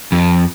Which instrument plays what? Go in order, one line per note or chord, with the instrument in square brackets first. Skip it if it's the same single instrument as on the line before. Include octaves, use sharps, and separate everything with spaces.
[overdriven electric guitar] F2